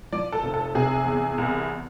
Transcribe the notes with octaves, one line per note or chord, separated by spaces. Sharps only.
F3 D5
A4
F1
A4
C3 G#4
E2
C2